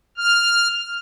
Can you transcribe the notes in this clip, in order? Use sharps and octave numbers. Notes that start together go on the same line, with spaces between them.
F6